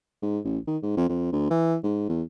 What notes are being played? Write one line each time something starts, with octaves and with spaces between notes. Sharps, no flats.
G#2
A1
D#3
G#2
F2
F2
D2
E3
G#2
E2